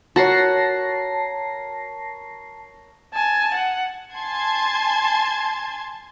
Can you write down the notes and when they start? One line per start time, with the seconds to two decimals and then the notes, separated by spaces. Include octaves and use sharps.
0.16 F#4 A#4 C#5 A5 A#6 C7
3.14 G#5 A5
3.54 F#5
4.14 G#5 A5 C6 G#6